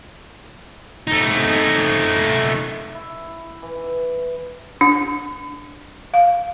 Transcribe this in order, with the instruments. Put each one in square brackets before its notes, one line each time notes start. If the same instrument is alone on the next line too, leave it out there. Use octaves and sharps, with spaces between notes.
[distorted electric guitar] A3 D#4
[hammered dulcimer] E4
E3
[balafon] D4
F5